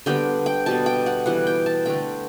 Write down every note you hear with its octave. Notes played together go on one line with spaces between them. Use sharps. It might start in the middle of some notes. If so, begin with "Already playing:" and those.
D3 G3 B3 G5
G5
B2 G3 B3 A5
G5
F#5
E3 G3 B3 F#5
G5
A5
D3 A3 G5